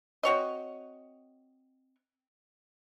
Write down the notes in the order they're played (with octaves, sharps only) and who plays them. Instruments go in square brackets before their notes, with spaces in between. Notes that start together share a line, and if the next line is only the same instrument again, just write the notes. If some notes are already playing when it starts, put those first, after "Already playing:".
[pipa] C4 F#4 C#5 D#5